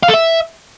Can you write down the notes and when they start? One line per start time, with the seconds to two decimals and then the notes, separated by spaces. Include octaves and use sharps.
0.03 F5
0.08 A4
0.14 E5